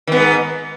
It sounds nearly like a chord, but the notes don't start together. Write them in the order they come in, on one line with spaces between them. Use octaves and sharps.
D#3 B3 G#2